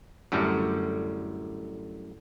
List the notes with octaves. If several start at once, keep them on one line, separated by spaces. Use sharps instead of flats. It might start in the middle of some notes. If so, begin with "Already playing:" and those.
F#2 A2 D3 G3